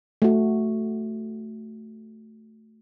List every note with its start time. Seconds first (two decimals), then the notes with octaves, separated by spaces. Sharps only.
0.22 A3 F#4